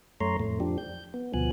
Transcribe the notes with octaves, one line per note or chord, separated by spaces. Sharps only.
F#2 A3 C#5 A#5 C6
F2 A2 A3
F2 F3 D4 G4
G6
B3
D2 B2 F3 B3 G#5 F#6